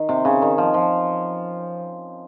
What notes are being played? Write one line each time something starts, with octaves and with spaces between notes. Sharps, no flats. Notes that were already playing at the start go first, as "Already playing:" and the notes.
Already playing: D#3
C3
C#3
D#3
F3
F3